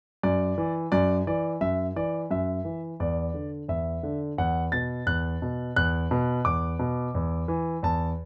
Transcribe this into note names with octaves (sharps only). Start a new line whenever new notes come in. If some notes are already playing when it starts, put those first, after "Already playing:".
F#2 D5
E3
F#2 D5
E3 D5
F#2 E5
E3 D5
F#2 E5
E3
E2 D5
D3
E2 E5
D3
E2 F#5
B2 A6
E2 F#6
B2
E2 F#6
B2
E2 D6
B2
E2
E3
E2 A5